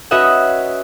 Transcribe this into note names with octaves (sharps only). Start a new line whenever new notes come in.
C#4 F#4 B4 D#5 E5 F#5